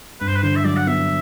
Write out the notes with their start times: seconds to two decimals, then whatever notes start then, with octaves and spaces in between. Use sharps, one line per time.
0.20 G2 B4
0.28 C5
0.35 B4
0.43 D3 C5
0.56 E5
0.65 F#3 D5
0.76 F#5
0.87 B3 E5